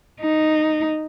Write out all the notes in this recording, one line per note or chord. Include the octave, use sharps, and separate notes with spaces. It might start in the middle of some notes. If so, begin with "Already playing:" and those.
D#4